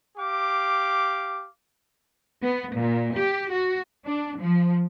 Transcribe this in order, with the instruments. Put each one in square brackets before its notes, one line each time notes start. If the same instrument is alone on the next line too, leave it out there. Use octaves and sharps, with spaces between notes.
[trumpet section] G4 F5 D6
[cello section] B3
A#2
G4
F#4
D4
F3